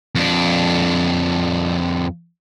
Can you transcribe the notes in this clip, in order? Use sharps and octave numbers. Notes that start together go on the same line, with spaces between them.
F2 D4